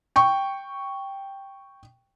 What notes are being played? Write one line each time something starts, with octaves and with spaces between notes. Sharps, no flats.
G5 C#6